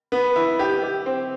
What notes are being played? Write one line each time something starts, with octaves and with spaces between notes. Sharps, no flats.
B3
E4
G4
G4
C4